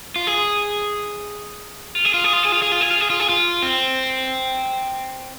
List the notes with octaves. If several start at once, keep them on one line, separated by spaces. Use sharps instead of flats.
F4
G#4
F4
G#4
F4
G#4
F4
G#4
F4
G#4
F4
G#4
F4
G#4
F4
G#4
F4
C4